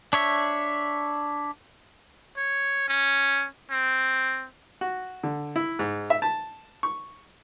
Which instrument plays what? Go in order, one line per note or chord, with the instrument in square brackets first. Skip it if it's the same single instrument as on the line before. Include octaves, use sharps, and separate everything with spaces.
[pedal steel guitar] D4 C#5 E5
[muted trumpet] C#5
C#4
C4
[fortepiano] F#4
D3
E4
G#2
E5
A5
C#6